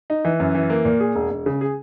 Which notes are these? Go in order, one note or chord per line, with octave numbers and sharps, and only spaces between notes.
D#4
E3
F#2
E3
A#3
A#2
G#4
E1
E1
C#3
G#4